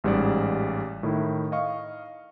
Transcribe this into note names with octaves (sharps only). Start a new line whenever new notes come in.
A1 G#2 G3 G#4 D5
A2 D#3 E4
D#5 F5 C#6